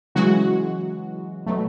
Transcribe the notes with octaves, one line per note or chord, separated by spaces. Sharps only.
C#3 E3 F#3 G#3 F#4
B2 F#3 A3